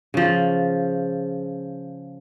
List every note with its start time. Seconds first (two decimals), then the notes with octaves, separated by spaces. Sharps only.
0.14 C#3 F3